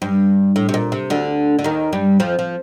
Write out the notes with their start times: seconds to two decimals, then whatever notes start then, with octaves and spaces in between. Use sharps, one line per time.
0.02 G2
0.56 A2
0.69 C3
0.74 A#2
0.92 C3
1.10 D2 D3
1.59 D3
1.64 D#2 D#3
1.93 G2 G3
2.20 F2 F3
2.39 F3